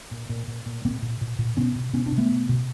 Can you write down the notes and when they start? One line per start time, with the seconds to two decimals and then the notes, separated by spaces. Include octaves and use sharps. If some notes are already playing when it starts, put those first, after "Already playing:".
0.11 A#2
0.29 A#2
0.48 A#2
0.66 A#2
0.85 A#2 A#3 C4
1.02 A#2
1.21 A#2
1.39 A#2
1.57 B2 B3 C#4
1.76 B2
1.93 B2 B3 C#4
2.06 C4 D4
2.12 B2
2.18 A3 B3
2.31 B2
2.49 B2